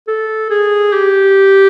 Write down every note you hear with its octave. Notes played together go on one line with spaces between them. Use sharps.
A4
G#4
G4